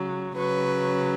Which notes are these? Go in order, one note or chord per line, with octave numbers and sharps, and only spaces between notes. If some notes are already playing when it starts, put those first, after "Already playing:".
Already playing: C#3 F#3
C#3 F#3 B4